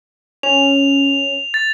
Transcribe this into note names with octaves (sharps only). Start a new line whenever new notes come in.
C#4 F7
A6